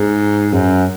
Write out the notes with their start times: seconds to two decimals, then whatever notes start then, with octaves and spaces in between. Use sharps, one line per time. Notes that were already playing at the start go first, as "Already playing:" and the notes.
Already playing: G#2
0.53 F#2